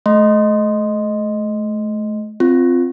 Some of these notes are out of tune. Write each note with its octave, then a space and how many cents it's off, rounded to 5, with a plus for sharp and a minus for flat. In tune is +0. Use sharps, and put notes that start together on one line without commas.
A3 -30 D#5 +0 C6 -5
C4 -5 F4 +0